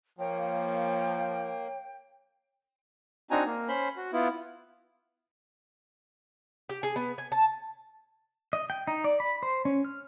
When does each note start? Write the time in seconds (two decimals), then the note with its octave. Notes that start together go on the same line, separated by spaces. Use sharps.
0.19 F3 A#3 C#5 G5
3.31 C4 D4 D#4 F#4 G#5 A#5
3.46 A#3
3.68 C#4 C5 B5 C6
3.97 F#4
4.13 B3 E4 F4
6.69 G4
6.83 G#4
6.96 B3
7.18 G#5
7.32 A5
8.53 D#5
8.70 G5
8.87 D#4
9.04 D5
9.20 B5
9.43 C5
9.65 C#4
9.85 F6